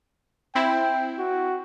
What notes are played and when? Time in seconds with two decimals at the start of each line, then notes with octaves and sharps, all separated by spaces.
0.55 C4 E4 G5
1.19 F#4